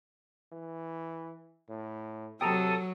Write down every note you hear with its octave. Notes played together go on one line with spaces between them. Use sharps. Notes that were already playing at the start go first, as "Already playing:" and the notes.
E3
A2
C3 F#3 A4 G5 A5 A#5 D#6